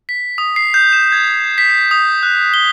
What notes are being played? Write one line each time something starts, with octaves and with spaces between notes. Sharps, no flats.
B6
D#6
C7
G6
E7
G#6
B6
C7
D#6
F#6
G7